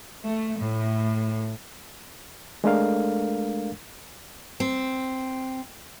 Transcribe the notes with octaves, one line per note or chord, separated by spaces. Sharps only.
A3
A2
G#3 A3 D4 A4 A#4 F5
C4